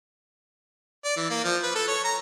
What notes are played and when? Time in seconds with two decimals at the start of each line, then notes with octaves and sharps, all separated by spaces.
1.04 D5
1.16 E3
1.30 A#3
1.44 F3
1.63 B4
1.75 A4
1.88 C#5
2.04 A#5